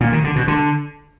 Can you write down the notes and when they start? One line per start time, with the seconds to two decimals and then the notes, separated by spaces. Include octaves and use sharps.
0.01 A#2
0.12 D#3
0.24 D3
0.36 B2
0.48 D3